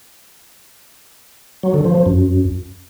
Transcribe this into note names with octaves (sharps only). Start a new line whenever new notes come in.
F#3
D3
F3
F3
F#2